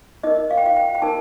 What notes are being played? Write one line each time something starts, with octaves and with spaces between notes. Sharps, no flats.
D#4 A#4 D#5
F5
G5
F5
G5
G5
D#4 A#4 A5